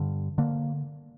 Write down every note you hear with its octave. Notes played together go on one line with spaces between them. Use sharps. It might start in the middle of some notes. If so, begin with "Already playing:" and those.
Already playing: G2 D3
D3 A#3